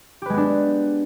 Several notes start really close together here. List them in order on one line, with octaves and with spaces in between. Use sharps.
G4 B4 G#3 B3 D4